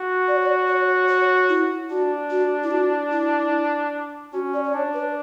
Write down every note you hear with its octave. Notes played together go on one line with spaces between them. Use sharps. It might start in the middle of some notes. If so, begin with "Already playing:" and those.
Already playing: F#4
D5
C#5
D5
C#5
C#5
E4
D4 F#4
F#4
E4
F#4
E4
C#4 F#4
D5
D5
D4 C#5
B4